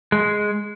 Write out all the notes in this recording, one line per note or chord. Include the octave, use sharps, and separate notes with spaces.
G#3